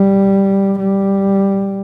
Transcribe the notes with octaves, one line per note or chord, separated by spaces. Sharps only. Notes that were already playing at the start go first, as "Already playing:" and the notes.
Already playing: G3
G3